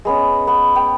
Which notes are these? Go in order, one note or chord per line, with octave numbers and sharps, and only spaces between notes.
G#3 B3 C#4
B3
G5